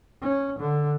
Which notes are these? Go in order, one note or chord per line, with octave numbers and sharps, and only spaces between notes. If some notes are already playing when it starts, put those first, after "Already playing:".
C#4
D3